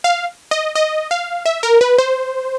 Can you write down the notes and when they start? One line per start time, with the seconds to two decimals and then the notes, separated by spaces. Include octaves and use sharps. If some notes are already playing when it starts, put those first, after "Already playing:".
0.04 F5
0.51 D#5
0.75 D#5
1.11 F5
1.46 E5
1.63 A#4
1.81 B4
1.98 C5